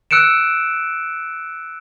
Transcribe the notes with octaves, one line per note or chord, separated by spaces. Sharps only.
E6 F#6 C#7 D7 E7